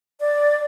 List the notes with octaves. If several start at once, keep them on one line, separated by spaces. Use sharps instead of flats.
D5